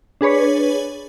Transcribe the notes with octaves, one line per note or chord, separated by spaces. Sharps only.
D4 G#4 B4 C#5